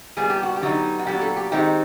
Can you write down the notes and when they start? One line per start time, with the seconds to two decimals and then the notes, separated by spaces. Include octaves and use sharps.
0.17 A#2 G3 B3 G#4
0.30 G4
0.43 F#4
0.56 G4
0.61 D3 F#3 B3 D#4
0.99 F#4
1.07 A#2 F#3 B3 D4 G4
1.21 A4
1.36 G4
1.52 D#3 G#3 C4 D#4 G4